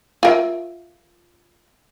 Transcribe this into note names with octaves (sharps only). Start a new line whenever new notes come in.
F4 A#4 E5